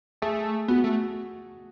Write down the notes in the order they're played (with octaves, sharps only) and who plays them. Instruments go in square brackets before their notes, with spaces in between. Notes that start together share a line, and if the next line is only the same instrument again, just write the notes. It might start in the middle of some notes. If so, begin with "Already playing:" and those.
[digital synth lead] A3 [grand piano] G#4
[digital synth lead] B3 [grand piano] F#4
[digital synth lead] A3